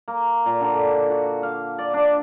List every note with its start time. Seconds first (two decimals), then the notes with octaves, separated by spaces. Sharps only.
0.08 A#3
0.46 A#2
0.61 D3
1.10 F#4
1.43 F5
1.78 D5
1.94 D4